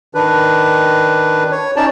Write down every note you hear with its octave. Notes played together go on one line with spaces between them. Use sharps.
D#3 D4 B4
C#5
C#4 D#4 C#5 D5 A5